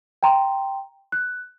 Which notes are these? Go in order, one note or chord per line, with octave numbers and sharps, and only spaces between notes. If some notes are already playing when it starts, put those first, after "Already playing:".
G5 A#5 C6
F#6